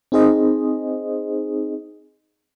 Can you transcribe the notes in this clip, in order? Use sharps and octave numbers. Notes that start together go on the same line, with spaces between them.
C4 D#4 G#4 C5 D#5